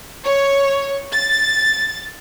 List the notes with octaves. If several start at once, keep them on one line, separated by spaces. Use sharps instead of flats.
C#5
A6